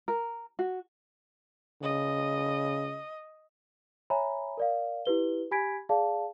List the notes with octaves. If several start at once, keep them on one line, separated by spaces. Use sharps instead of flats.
A#4
F#4
C#3 D#5
C#5 E5 G#5 A#5 B5
A#4 D5 F5
E4 G4 B4 G7
G4 G#5 B5 G#6 B6 D7
G#4 D5 F5 A5